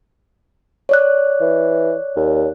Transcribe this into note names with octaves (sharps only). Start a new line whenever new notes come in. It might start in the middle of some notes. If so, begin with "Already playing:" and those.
C#5 D5 F#6
E3
D#2